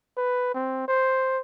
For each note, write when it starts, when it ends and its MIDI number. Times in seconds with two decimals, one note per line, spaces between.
0.17 0.50 71
0.54 0.84 60
0.88 1.41 72